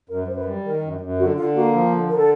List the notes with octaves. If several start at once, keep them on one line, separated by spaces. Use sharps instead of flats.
F#2 A#4
F#2 C5
B4
G3
D#3 A#4
F#2
F#2
D3 F#4
D3 F4
A#3 F#4
F3
D3
D3 A#4
A4